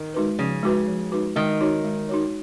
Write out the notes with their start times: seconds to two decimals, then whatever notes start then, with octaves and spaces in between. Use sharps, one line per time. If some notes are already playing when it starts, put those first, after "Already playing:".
Already playing: D#3
0.14 G#3 D#4 F#4 B4
0.39 C#3 F3
0.63 G#3 D#4 F#4 B4
0.87 F3
1.12 G#3 D#4 F#4 B4
1.36 D#3 G#3
1.61 D#4 F#4 C#5
1.84 G#3
2.09 D#4 F#4 C#5